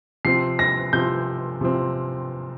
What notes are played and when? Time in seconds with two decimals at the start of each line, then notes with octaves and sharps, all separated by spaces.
0.25 C3 F3 C4 C7
0.59 A#6
0.93 C3 F3 C4 G6
1.61 C3 F3 C4